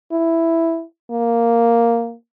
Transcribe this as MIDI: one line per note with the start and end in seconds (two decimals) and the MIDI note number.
0.12 0.83 64
1.11 2.14 58